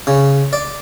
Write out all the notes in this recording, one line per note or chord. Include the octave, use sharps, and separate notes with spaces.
C#3
D5